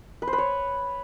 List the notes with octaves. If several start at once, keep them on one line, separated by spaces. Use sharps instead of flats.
B4
C5
B4
C#5